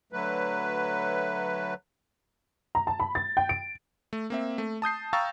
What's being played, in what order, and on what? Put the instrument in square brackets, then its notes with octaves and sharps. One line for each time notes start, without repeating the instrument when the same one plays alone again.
[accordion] D3 F#3 A3 B4
[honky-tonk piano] A#5
A5
B5
A6
G5
D7
[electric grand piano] A3
A#3 C4 E5
A3
A5 D#6 G6 C7
F5 G5 A#5 C#6 E6 A6